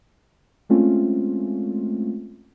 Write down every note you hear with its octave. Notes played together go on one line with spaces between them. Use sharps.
G#3 A3 C4 C#4 F4